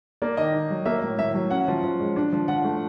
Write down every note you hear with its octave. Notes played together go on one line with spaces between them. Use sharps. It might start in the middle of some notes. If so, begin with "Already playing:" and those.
A#3 D5
D#3 D#5
D#3
F#3
A#3 E5
A2
A2 E5
F#3
C#4 F#5
F3
F3
G#3
D4
F3
F3 F#5
A3